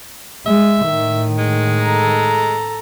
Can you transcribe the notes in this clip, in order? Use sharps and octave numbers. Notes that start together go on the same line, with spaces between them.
G#3 E5
A2 D#3
G#3
A4 A#5